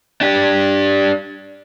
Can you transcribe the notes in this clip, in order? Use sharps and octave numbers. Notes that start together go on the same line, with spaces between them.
D4 G4